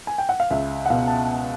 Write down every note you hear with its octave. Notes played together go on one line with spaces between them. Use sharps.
G#5
G5
F#5
F5
C#2 E5
F#5
B2 F5
A5